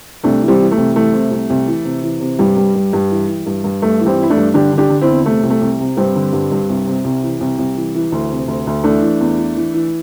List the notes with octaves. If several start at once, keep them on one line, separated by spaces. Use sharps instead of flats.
C2 A3 D4
E3
G3 C4
E3
A3
C2
E3 A3
C3
C2
C2
E3
C3
E3
C3
G2 G3
G2
G2
G2
E3
E3
G2
G2
G2 A3
E3
G3 C4
E3 E4
A3 D4
G2
D3 D4 G4
D3
D4 G4
D3
C4 E4
E2
C3 A3
C2
A3
C2
C3
G2 G3 C4
D3
G2
G2
C2
C3
C2
E3
C2
C2
E3
E3
D2
C3
D2
D2
E3 A3 D4
E3
E2
E3
E3
E3